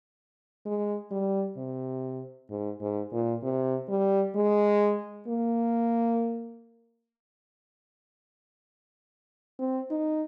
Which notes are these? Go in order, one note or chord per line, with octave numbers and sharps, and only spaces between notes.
G#3
G3
C3
G#2
G#2
A#2
C3
G3
G#3
A#3
C4
D#4